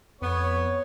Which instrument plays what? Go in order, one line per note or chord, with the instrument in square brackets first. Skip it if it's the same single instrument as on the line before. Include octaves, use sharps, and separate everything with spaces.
[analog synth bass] F2 [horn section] B3 [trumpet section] C#5